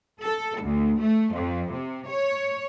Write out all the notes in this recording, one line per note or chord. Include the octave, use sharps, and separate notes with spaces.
A4
D2
A3
F2
C3
C#5